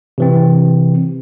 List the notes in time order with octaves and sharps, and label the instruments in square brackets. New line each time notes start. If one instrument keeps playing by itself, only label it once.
[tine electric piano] C3 E3 C4